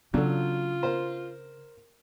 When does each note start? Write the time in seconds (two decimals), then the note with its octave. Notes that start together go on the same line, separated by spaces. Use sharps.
0.14 C#3 F#3 D4 F4 F#4 A4
0.83 A#4 C5